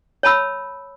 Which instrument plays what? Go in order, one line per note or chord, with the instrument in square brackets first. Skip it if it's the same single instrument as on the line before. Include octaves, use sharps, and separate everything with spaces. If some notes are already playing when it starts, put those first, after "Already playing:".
[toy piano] C#5 A5 B5 E6